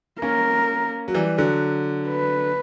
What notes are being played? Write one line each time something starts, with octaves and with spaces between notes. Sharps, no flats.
A#3 C#4 A#4
F#3
E3 G3
D3 F#3
B4